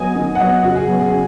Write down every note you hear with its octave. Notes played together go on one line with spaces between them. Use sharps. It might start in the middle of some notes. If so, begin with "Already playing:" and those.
Already playing: F#3 B3 D#5 G#5
D#3
F#5
F#3 B3 D#5
C#3 F#4
G#4
F#3 B3
G#4
C#3